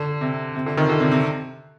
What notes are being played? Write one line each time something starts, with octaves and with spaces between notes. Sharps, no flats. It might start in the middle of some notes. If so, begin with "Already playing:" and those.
Already playing: D3
C3
C3
D3
C3 D#3
D3
C3
C3